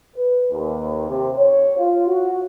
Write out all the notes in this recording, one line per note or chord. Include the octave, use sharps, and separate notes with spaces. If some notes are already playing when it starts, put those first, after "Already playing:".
B4
D#2
C3
C#5
F4
F#4